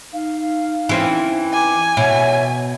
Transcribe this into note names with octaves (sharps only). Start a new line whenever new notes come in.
D#4 F5
E3 C4 C#4
G#5 D6
B2 C#5 E5